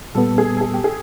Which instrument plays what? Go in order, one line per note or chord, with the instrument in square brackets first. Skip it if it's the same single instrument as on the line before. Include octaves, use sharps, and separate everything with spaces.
[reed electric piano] A#2 G3 B3 [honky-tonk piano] A4
[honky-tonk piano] G#4
A4
G#4
G4
G#4